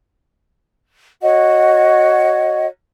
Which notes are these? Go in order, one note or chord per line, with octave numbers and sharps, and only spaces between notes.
F#4 C#5 D#5 F#5